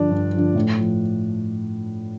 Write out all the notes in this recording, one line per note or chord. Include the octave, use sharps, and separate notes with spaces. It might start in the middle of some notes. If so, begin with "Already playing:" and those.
Already playing: G2 D3 F3 D4 D5
G2
D3 F3
A2
F3